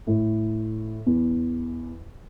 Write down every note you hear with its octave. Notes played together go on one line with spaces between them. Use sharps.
A2
E2